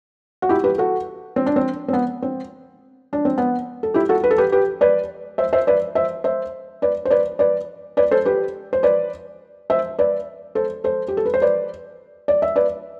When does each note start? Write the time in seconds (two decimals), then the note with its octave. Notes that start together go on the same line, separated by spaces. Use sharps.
0.42 F#4
0.49 E4 G4
0.64 G4 B4
0.78 F#4 A4
1.36 C4
1.46 D4
1.56 C4
1.88 C4
1.93 B3
2.22 C4
3.13 D4
3.25 C4
3.38 B3
3.83 A4
3.94 E4 G4
4.09 F#4 A4
4.24 B4
4.31 A4
4.38 G4 B4
4.52 G4 B4
4.81 B4 D5
5.38 C5 E5
5.53 C5 E5
5.67 B4 D5
5.95 C5 E5
6.24 C5 E5
6.82 B4 D5
7.05 C5
7.10 B4 D5
7.39 B4 D5
7.97 B4 D5
8.11 A4 C5
8.25 G4 B4
8.73 C5
8.83 B4 D5
9.70 C5 E5
9.99 B4 D5
10.55 A4 C5
10.84 A4 C5
11.08 G4
11.17 A4
11.25 B4
11.34 C5
11.42 B4 D5
12.28 D5
12.42 E5
12.56 B4 D5